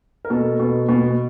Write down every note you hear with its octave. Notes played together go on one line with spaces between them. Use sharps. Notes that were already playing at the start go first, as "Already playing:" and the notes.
A#4
B2 A4
B2
B2